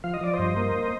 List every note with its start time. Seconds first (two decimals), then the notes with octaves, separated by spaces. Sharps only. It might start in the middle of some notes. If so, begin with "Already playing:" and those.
0.04 F3 F5
0.14 D#5
0.21 F3 D5
0.34 C5 D#5
0.39 G2
0.56 A#3